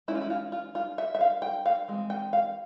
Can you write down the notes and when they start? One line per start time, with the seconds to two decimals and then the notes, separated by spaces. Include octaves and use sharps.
0.08 E3 G#3 C#4 E4
0.15 F4
0.21 E4
0.30 F4
0.52 F4
0.75 F4
0.98 E5
1.15 E5
1.21 F5
1.42 G5
1.66 F5
1.88 E3 G#3 C4
2.10 G5
2.33 F5